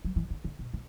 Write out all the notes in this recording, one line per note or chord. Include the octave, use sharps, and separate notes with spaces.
F#3
E3
D3
D3
B2
C#3